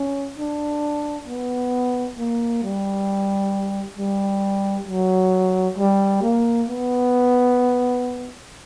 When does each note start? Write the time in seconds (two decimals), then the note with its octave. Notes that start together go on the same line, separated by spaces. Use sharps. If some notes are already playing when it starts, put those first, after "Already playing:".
Already playing: C#4
0.38 D4
1.27 B3
2.18 A#3
2.63 G3
3.98 G3
4.88 F#3
5.78 G3
6.22 A#3
6.68 B3